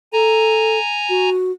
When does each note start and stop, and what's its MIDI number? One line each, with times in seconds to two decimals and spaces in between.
0.13 0.78 69
0.13 1.29 80
0.13 1.29 82
1.09 1.52 66